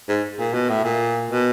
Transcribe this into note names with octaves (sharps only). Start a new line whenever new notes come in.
G#2
A#2
B2
A2
A#2
B2